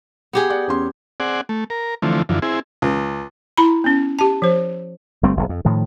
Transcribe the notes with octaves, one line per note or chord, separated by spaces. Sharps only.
B3 G4 G#4
D5 F#5
E2 C#4 C6
C4 G#4 D5 F#5
A3
A#4
D3 E3 F3 A3 C4
F#2 D3 E3 F3
C4 E4 G#4
C#2
E4 A#5 B5
B3 C#4
G4 A5
F3 C5
G1 G3 A3 C4
F#1 B1
F2
A2 D#3 F3